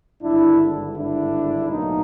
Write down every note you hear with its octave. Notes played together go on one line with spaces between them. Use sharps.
G#1 G2 D3 D4 E4
D4 E4
B1 A2 F#3 A#3 C#4 D#4